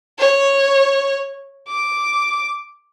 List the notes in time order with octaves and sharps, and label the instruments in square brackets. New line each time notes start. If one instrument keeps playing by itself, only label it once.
[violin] C#5
D6